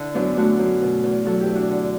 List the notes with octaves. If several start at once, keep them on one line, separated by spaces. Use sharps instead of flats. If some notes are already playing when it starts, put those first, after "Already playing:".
Already playing: D3 E4
F#2 B3 D4
A3 D4 F#4
F#2
B2
E2
F#3 F#4 A4
E4 G4
E2
D4 F#4
D3